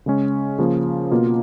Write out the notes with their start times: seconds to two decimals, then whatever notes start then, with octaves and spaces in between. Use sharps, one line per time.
0.06 C#3 G#3 C#4
0.58 C#3 F3 A#3 F4
1.12 B2 A#3 F4